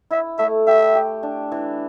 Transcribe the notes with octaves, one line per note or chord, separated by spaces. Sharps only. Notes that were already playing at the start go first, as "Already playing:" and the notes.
E4 E5
A3 E5
G4 E5
G4
D4
E3